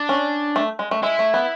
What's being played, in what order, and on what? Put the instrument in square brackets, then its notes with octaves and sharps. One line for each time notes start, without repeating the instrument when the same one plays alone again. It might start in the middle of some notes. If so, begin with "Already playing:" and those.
Already playing: [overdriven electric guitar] D4
[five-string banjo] C#4
A3
G#3
A3
[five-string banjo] G#3 [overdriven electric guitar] E4
[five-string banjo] A3
B3